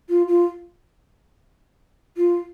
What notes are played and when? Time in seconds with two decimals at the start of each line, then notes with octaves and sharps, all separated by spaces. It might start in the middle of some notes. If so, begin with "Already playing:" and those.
0.09 F4
0.28 F4
2.17 F4